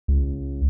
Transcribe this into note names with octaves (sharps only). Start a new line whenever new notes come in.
C#2